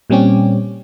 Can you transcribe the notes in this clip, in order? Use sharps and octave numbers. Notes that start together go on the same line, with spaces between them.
A#2 G3 C4 C#4 G4